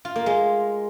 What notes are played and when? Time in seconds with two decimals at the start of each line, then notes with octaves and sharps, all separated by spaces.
0.05 F4
0.16 A#3
0.26 G#3